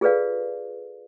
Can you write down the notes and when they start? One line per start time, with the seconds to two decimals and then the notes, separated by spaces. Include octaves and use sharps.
0.01 F4 G#4 A4 B4 D5 F5